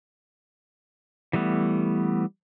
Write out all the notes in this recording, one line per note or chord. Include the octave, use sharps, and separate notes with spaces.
E3 G3 A3 B3